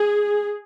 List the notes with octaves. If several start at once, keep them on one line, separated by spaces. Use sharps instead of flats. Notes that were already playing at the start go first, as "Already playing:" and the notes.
Already playing: G#4